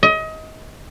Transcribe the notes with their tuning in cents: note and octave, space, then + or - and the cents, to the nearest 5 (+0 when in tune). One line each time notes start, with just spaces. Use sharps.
D#5 +30